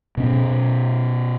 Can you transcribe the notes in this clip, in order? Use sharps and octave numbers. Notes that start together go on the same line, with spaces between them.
B2 C#4